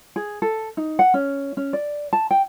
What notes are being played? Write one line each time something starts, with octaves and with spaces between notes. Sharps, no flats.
G#4
A4
D#4
F#5
C#4
C#4
D5
A5
G5